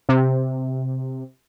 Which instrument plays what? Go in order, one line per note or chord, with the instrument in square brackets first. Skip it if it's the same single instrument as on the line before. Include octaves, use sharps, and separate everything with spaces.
[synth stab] C3